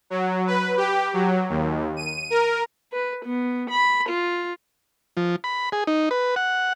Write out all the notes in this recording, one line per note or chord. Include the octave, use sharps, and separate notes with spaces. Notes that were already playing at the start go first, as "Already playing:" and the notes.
F#3
B4
G4
F#3
D#2
D#7
A#4
B4
B3
B5
F4
F3
B5
G#4
D#4
B4
F#5